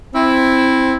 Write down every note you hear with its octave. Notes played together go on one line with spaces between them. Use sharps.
C4 E4